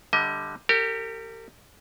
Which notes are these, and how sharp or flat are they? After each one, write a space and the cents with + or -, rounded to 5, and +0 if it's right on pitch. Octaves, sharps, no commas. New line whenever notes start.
D3 +0 G3 +5 D#5 +35
G4 +0 A#4 -40